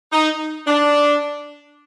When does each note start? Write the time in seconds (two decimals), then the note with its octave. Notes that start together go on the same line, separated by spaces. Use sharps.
0.12 D#4
0.67 D4